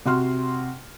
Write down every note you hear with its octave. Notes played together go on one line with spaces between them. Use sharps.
C3 F#4 C6 F6